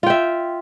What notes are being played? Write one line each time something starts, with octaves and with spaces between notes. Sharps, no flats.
F4 E5 G5